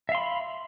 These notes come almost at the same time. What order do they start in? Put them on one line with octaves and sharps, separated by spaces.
E5 F5 C6 B5